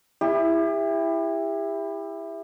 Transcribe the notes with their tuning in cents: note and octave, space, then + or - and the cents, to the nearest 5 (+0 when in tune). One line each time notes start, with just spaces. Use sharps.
E4 +5 G4 +35